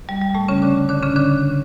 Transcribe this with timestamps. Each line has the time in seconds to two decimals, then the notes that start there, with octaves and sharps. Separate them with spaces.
0.09 G3
0.22 G3
0.35 A2 A3
0.48 C#3 C#4
0.62 D3 D4
0.89 D3 D4
1.02 C#3 C#4
1.16 D3 D4